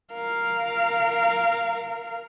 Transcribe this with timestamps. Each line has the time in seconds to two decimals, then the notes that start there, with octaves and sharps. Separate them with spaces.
0.13 A#4 F5